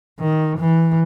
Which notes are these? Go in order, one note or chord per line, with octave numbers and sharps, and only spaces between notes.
D#3
E3